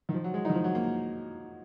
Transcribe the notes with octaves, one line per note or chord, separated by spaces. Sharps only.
D#3
F3
F#3
G#3
D#4
D#3
F3
F#3
A#3